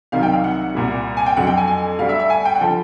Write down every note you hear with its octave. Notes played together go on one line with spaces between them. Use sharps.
C2 C3 D#3 F#3 F5
G5
F5
F#5
C2 A#2 G3
G#5
G5
F2 D3 F#3 F#5
G5
G#5
G#5
D2 D3 G3 F5
E5
E5
G#5
G5
F#5
D3 F3 G5